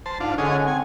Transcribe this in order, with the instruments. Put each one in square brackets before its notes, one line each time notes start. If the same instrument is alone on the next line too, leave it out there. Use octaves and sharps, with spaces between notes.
[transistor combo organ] C5 A5
[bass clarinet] G#2 [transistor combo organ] D4 F4
[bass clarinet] D3 [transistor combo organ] C#4 G#4 D#5
[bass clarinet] C4 [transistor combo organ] G#5